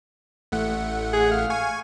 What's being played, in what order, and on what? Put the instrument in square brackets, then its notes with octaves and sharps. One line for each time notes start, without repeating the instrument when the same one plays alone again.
[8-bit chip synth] A1 A3 F#5
[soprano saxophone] G#4
F5
[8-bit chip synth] G#5 C#6